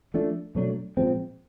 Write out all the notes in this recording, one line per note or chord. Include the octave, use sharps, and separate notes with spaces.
F3 A3 D4
B2 F#3 A3 D4
A#2 F3 G#3 C4